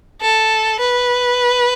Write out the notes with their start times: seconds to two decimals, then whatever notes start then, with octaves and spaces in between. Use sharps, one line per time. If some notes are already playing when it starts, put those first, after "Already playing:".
0.21 A4
0.80 B4